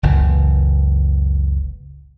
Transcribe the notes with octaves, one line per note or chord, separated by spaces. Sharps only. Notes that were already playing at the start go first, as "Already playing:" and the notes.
F#1 C#2 A#2 E3